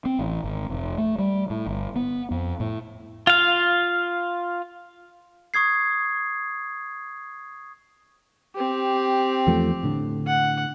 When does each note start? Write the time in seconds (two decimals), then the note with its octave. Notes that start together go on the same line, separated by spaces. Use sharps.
0.05 C4
0.19 A1
0.44 G#1
0.70 F1
0.98 A3
1.19 G3
1.50 A2
1.67 G1
1.96 B3
2.31 F2
2.60 A2
3.27 F4 F5
5.54 C#6 D#6 G#6 C7
8.55 C4 G4
9.47 E2 F3 A3
9.83 A2 D3
10.27 F#5